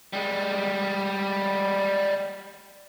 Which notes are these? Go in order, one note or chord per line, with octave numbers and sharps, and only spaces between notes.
G3 G#3